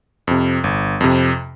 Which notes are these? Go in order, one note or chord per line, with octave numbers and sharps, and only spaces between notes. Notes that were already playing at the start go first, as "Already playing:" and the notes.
F2 C3
G1
F2 C3